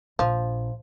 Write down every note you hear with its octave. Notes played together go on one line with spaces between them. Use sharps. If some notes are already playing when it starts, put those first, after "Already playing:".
A#1 F3